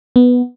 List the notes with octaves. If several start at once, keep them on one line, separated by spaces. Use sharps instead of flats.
B3